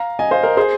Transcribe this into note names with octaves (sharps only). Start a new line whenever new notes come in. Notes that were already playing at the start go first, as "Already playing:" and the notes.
Already playing: F5 A#5
D#5 G#5
C5 F5
A#4 D#5
G#4 C5